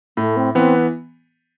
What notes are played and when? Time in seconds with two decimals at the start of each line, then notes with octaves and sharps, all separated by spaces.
0.17 A2 A3
0.37 C4
0.54 E3 B3 C4